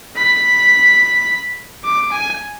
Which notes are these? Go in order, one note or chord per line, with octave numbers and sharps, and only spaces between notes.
B5
D6
G#5